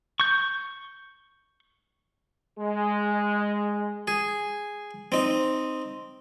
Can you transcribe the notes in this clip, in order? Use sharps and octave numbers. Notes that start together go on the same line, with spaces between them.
C#6 G6
G#3
G#4
C4 D#4